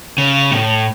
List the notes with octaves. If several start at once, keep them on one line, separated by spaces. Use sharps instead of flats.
C#3
A2